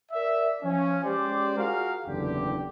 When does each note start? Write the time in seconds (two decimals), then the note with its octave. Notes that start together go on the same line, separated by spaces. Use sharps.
0.12 A#4 D5 E5
0.63 F3 C#4
1.04 G#3 C#4 G4 C5 D5
1.57 F4 F#4 G#4 A#4 F5
2.06 F#1 E2 D3 G4